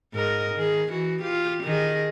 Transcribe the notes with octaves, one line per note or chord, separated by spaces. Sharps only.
G#2 A#4 D#5
D#3 G#4
E3 F#4
F4 G4
D#3 G#4 D#5